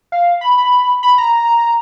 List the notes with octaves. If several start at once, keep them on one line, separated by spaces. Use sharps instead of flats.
F5
B5
B5
B5
A#5